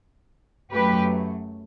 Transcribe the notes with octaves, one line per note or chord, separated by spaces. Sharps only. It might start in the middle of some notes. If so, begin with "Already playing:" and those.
F#2 F#3 A3 G4 B4